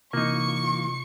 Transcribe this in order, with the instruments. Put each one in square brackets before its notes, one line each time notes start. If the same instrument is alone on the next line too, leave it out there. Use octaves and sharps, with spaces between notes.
[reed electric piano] C3 [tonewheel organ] E3 F4 [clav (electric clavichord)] A#3 D#4 [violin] C#6 C#7